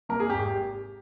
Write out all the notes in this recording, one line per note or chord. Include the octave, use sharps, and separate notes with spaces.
C3 G3 A#3 A#4
G#4
G#1 G4